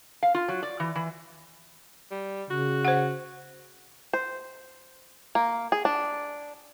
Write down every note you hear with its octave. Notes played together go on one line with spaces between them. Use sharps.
F5
F4
F#3
D5
E3
E3
G3
C#3 F#4
C5 F#5
C5
A#3
G#4
D4